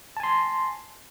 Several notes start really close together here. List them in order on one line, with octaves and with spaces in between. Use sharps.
A5 G#5 C6